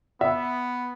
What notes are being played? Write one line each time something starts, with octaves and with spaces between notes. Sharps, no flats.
B3 E5